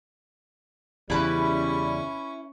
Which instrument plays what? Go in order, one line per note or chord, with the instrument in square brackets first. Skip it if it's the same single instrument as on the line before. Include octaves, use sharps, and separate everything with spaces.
[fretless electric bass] E2 C#3 [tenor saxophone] G3 [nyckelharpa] C#4 C#6 [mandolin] E4 B4